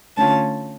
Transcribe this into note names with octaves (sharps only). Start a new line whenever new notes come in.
D3 A3 C#4 F4 A5